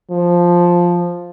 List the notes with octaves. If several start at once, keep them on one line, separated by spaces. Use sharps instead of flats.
F3